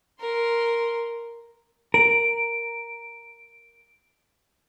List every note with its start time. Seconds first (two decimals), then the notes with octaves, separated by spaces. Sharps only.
0.20 A#4 C6
1.94 A#4 D7